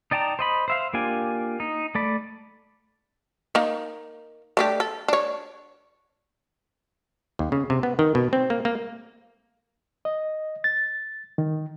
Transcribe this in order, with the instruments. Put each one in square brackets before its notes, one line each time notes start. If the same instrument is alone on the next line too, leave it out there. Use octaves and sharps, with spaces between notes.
[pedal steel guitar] D#4 D5 G5 A5 A#5
C5 D#5 B5
C5 E5 F5
A#3 D4 F4 G4 G#5
D#4
A3 D5 B5
[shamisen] A#3 D#4
A3 D4 G4
A4
D4 C#5
[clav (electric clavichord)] D#2
C#3
C3
B3
D#3
B2
C4
A#3
A#3
[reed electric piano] D#5
A6
D#3